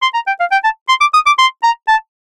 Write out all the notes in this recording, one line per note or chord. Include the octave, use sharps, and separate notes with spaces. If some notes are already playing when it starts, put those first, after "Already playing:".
C6
A#5
G5
F5
G5
A5
C6
D6
D#6
D6
C6
A#5
A5